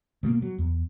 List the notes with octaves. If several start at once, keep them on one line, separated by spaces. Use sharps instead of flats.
B2 A3 A#3
F#3
E2